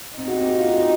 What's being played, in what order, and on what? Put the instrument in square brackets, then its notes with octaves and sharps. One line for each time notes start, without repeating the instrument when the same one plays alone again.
[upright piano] C4 [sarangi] D#4
[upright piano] F#4
G4
F#4
F4
F#4
G4